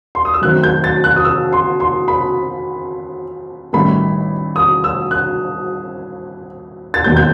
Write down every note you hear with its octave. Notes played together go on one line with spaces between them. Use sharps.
C6
D#6
E6
F#2 D#3 A3 C4 F#6
G6
A6
F#6
D#6
E6
C6
C6
B5
A1 G2 D#3 A3 B5
D#6
E6
F#6
A6
E1 D#2 D#3 G6
G6